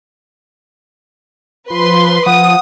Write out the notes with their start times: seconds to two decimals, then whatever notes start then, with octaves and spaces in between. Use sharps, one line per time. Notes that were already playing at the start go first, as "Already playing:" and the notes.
1.70 F3 B4 C6
2.26 F3 F#5 D#6